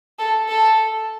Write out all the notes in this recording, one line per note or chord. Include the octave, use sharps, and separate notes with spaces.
A4
A4